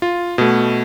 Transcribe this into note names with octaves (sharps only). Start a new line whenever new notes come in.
F4
B2 A3